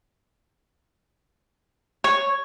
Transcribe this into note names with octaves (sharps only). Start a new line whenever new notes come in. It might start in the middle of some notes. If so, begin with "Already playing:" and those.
C#5